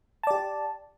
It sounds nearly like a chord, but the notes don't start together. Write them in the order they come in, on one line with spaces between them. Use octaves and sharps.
A5 D5 G4